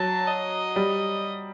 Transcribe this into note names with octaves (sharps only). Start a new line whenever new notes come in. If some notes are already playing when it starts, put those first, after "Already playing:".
Already playing: F#3 A5
D#5
G3